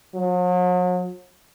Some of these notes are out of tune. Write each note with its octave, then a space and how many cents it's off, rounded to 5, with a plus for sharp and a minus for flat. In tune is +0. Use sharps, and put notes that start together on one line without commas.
F#3 -45